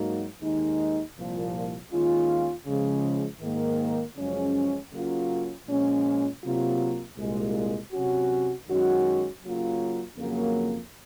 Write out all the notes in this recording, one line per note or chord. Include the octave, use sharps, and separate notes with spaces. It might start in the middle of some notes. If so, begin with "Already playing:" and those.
Already playing: G#2 F#3 A#3 D#4 F#4
D#2 D#3 G#3 D#4
C2 A#2 F3
D#2 D#3 G#3 C#4 F4
C#3 F3 G#3
G#2 D#3 A#3
F#2 C#3 F3 G#3 C#4
C#3 F#3 A#3 C#4 F4
A#2 F3 G#3 C#4
C3 F#3 A#3 F4
C2 A#2 G#3
C3 F#3 C#4 F#4
F#2 D#3 G#3 C#4 F#4
C#3 F#3 A#3 F4
F2 C#3 F#3 A#3